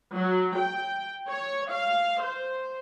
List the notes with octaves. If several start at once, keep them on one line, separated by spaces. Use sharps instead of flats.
F#3
G5
C#5
F5
C5